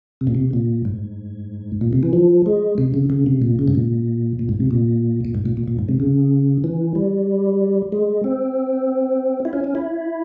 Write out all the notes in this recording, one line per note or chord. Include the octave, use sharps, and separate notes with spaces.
C3
A#2
C3
A#2
G#2
A#2
C3
E3
F3
G#3
C3
C#3
C#3
C3
A#2
C#3
G#2
A#2
A#2
G#2
C3
A#2
A#2
G#2
A#2
A#2
A#2
G#2
C3
C#3
E3
G3
G#3
C4
E4
C#4
C#4
E4